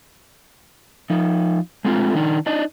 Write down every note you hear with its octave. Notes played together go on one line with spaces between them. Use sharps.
F3 D#4
G#3 A3 C4 E4 F4
D#3 D4 D#4
D4 D#4 D5 D#5